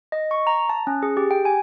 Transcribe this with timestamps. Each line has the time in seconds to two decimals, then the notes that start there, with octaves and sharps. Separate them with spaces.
0.12 D#5
0.31 C#6
0.47 A#5
0.69 A5
0.87 C#4
1.03 G#4
1.17 G4
1.31 G5
1.45 G#5